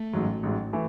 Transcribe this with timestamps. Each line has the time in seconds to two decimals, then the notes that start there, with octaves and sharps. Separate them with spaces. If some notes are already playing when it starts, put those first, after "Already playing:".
Already playing: A3
0.13 A1 G#2 F#3
0.43 A1 G#2 F#3
0.73 E3 A3